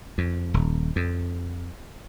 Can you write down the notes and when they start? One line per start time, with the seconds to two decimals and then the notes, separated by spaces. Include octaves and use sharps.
0.18 F2
0.54 D#1
0.96 F2